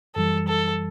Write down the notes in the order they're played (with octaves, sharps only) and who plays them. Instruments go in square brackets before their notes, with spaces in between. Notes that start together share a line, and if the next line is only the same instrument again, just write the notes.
[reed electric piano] F#2 E3 G3 [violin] A4
[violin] A4